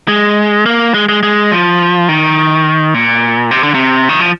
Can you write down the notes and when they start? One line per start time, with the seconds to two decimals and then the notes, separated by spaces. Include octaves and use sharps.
0.08 G#3
0.66 A#3
0.94 G#3
1.09 G#3
1.23 G#3
1.51 F3
2.09 D#3
2.94 A#2
3.51 C3
3.63 D3
3.74 C3
4.09 D#3
4.20 F3